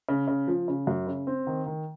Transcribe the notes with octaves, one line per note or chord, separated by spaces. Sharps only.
C#3
C#3
F3
C#3
F#2
C#3
C4
D#3
D#3